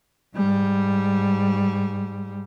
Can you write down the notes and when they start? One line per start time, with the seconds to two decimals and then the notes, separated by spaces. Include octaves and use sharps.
0.36 G#2 G3